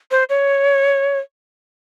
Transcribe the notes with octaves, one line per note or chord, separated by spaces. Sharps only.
C5
C#5